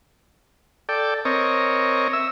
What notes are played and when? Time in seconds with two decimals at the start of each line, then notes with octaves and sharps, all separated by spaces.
0.89 A4 D5 G5
1.25 C4 A#4 C#5 D#5
2.13 E5 E6